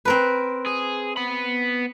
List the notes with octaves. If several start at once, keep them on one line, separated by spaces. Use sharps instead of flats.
C4 A#4 B4
G#4
B3 B5